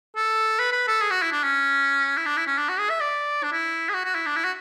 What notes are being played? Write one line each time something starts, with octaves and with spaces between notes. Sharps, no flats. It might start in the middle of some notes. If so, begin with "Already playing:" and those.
A4
B4
B4
A4
G#4
F#4
E4
D4
C#4
E4
D4
E4
C#4
D4
F#4
G#4
E5
D5
D4
E4
G#4
F#4
F#4
E4
D4
E4
F#4